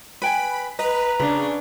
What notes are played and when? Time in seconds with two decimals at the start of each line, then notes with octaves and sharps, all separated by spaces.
0.22 B4 G5 G#5 B5
0.79 B4 D#5 A#5
1.20 C#3 C#4 D4 B4